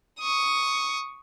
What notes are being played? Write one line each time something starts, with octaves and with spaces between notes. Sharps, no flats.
C#6 D#6